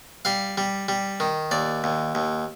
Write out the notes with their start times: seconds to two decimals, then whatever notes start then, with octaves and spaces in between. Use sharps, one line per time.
0.25 G3 F5
0.58 G3
0.88 G3
1.20 D#3
1.51 D#2 D5
1.84 D#2
2.15 D#2